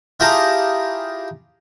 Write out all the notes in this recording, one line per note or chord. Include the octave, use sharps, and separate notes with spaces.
E4 F4 G4 G#4 A5 A#5